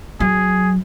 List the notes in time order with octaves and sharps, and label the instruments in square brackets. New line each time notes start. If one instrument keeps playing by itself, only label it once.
[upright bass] F#3 [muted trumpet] G#4